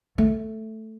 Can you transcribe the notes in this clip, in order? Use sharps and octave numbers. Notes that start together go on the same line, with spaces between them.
A3